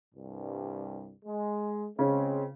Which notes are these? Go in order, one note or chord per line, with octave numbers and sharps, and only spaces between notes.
C2 G2
G#3
C#2 C#3 G#3 C4 C#4